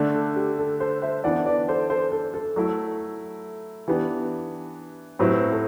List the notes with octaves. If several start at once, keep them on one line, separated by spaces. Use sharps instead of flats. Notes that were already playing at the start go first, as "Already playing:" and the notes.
Already playing: D3 A3 D4
A4
G4
A4
A4 C5
C5 E5
E3 B3 D4 D5 F#5
B4 D5
A4 C5
A4 C5
A4
A4
F#3 A3 E4
E3 B3 D4 G4
A2 F#3 C4 E4 G4 B4
A4 C5